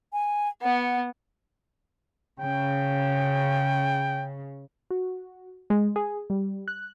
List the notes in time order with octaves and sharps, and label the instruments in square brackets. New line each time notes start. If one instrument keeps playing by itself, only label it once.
[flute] G#5
[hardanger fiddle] B3 [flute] F#5
[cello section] C#3 [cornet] G5
[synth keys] F#4
G#3
G#4
G3
F#6